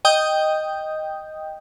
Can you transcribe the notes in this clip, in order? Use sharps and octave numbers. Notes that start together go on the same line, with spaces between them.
D#5 G5 D#6 G6